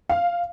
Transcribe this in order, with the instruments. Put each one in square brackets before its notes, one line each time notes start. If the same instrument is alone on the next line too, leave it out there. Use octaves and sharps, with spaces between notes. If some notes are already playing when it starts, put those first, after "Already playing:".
[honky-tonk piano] F5